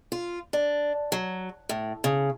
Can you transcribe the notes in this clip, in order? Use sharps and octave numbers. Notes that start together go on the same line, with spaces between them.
F4
D4
F#3
A2
C#3